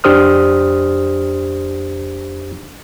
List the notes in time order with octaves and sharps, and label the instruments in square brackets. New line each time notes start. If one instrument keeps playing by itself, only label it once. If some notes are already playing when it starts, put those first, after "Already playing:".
[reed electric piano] F2 D4 G4 C5 D#6 F6